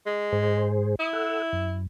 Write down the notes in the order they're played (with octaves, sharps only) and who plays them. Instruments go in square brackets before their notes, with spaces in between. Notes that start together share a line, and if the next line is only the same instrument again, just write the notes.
[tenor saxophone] G#3
[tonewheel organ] G#2 G#4 C5
[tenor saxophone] E4 [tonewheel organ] D#6
[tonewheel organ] A4 F#5 E6
F#2